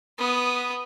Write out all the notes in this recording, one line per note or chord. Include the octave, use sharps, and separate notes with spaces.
B3 D#6